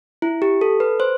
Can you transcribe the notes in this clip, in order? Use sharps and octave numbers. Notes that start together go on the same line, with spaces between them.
E4
G4
A4
B4
C5